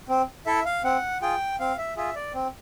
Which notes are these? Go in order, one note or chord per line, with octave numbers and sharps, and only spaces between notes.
C4
E4 A4 E5
F5
C4 F#5
F4 G#4 G5
C4 F5
E5
F4 G#4 E5
D5
C4